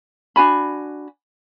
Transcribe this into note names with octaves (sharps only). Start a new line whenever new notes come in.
D4 F#4 G#5 B5